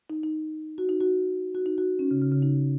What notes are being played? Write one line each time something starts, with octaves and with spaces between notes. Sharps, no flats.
D#4
D#4
F#4
D#4
F#4
F#4
D#4
F#4
C#4
C#3
C#3
C#3
D#4